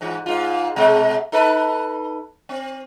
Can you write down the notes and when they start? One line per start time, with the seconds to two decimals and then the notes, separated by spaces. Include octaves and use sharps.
0.01 G#2 E3
0.26 G#2 F4
0.76 B2 G#3 A3
1.32 D#4 A4 B4
2.49 C4